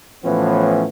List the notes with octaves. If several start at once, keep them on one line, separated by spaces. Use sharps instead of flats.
A2 E3 F3 B3 C#4